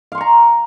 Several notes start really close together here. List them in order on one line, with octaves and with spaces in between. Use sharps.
F5 C6 C#6 A#5